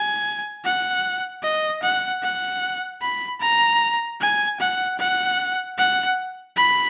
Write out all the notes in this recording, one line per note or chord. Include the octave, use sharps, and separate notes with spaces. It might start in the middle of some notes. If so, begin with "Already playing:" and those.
Already playing: G#5
F#5
D#5
F#5
F#5
B5
A#5
G#5
F#5
F#5
F#5
B5